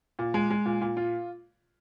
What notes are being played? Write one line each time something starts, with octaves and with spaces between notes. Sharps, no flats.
A#2
G#3
G#3
A#2
A#2
F4